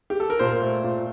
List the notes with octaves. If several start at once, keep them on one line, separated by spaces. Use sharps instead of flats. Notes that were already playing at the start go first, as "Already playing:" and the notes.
G4
A4
A#4
A#2 C5
A3
A#2